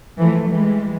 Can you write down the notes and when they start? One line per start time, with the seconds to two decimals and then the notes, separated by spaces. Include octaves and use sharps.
0.17 E3 F3 A3
0.48 E3 G3 G#3